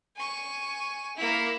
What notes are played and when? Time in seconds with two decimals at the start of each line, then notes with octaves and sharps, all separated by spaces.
0.16 G#5 C#6
1.16 A#3 E4